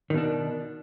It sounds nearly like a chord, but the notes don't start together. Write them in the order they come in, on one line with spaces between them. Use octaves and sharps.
D#3 B2 D4